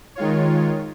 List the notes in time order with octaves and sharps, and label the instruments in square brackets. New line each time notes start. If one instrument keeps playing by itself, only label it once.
[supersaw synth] D#3 G#3 F4 C#5